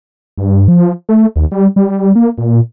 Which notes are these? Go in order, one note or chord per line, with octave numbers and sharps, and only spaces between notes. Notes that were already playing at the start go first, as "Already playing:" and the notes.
G2
F3
A3
D#2
G3
G3
A#3
A#2